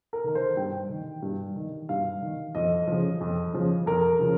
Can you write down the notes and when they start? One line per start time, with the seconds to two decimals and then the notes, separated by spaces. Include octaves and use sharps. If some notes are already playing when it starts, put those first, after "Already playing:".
0.13 A#4
0.24 D#3
0.35 C5
0.57 G2 G5
0.89 D#3
1.22 G2
1.56 D#3
1.89 G2 F5
2.22 D#3
2.55 F2 D#5
2.87 C#3 F3
3.21 F2
3.53 C#3 F3
3.86 F2 A#4
4.19 C#3 F3